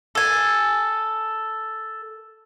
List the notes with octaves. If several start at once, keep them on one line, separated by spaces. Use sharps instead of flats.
A4 G#5